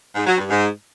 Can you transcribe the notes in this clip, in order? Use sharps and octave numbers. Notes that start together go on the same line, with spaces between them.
G#2
F#3
G2
G#2